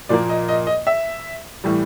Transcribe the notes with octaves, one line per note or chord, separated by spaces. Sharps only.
A#2 F3 A#3 D5
D#5
D#5
D#5
E5
A2 E3 G3